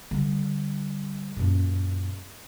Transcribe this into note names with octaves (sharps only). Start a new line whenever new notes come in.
D3 G3
F#2 A#2